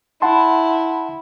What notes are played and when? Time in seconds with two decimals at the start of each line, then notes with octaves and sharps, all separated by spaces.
0.22 E4 F#5 A5 C6